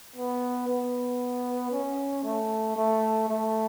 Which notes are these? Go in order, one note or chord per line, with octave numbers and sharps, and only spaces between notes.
B3
B3
C#4
A3
A3
A3